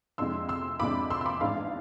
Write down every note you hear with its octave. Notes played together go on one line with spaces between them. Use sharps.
F2 C3 G#3 D4 C6 E6
C6 E6
F2 C3 G#3 D4 B5 D6
C6 E6
E6
B5 D6
A1 G#2 G#3 D4 F5